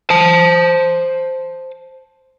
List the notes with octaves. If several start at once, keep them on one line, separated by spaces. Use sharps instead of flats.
C5 A5